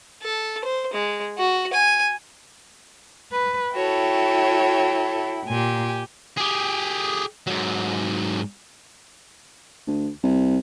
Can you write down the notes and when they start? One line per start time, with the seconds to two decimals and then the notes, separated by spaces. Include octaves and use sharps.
0.22 A4
0.64 C5
0.93 G#3
1.38 F#4
1.73 G#5
3.32 B4
3.73 E4 F#4 A4 C#5 G5
5.46 A#2 G4 G#5
6.38 G4 G#4
7.47 G#2 F#3
9.87 D2
10.23 C2